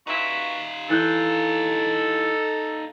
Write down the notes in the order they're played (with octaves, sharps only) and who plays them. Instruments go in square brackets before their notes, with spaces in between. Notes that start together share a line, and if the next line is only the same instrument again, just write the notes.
[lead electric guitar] D#4 F4 [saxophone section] F#4 B4 E5
[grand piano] E3 F#6 G6 [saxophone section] A4